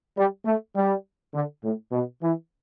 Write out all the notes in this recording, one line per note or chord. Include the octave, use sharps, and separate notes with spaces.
G3
A3
G3
D3
A2
B2
E3